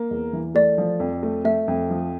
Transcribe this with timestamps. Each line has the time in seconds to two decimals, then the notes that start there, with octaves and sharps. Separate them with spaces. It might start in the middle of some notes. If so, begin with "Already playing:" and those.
Already playing: A#3
0.11 E2
0.33 E3
0.55 A3 D5
0.78 F3
1.00 F2
1.23 A3
1.45 A3 E5
1.68 F2
1.90 F3